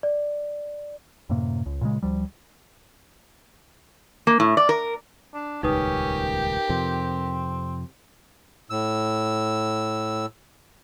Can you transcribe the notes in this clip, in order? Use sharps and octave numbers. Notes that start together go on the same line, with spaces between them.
D5
F#2 A2 C3 A#3
C#2
A#2 C#3 G#3
D2 F3 G3
A#3
A2
D5
A#4
D4
D#1 C#2 C#4 D#4 G4 A#4 B4 D#6
F2 C3 F3 C4
A2 E6